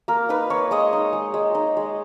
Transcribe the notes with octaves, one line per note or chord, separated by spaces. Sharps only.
A#3 A#4
D#4 B4
A#3 C#5
G#3 D#5
D#4
G#3
G#3
D#4
G#3